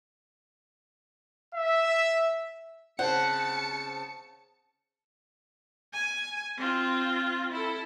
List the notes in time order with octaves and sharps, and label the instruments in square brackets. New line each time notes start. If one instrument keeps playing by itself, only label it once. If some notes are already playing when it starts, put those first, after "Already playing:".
[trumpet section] E5
[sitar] C#3 C4 [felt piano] C5 [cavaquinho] F#5 [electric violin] A5 C#7
[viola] G#5
C4 F4
E4 A4